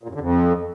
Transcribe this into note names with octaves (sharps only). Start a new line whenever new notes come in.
A#2
F#2
D3
F2